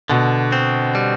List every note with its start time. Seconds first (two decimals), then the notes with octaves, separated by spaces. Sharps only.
0.09 B2 D3
0.52 C4
0.95 G3